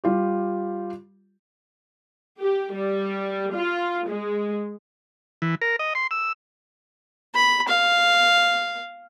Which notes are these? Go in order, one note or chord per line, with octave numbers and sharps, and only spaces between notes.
G3 F4 G4
G4
G3
F4
G#3
E3
A#4
D#5
C6
E6
B5
F5